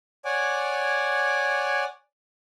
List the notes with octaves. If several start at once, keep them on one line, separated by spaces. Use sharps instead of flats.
C#5 D5 F#5 G#5 D6